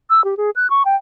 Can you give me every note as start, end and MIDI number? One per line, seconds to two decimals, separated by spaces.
0.10 0.24 88
0.24 0.37 67
0.37 0.50 68
0.56 0.70 90
0.70 0.83 85
0.85 0.95 79